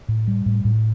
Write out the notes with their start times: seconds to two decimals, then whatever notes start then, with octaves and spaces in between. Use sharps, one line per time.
0.08 A2
0.28 G3
0.46 A2
0.65 A2